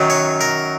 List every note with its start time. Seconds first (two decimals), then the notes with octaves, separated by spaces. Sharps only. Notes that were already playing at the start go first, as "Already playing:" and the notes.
Already playing: F#2 D#3 F#3
0.10 C#5
0.41 A#4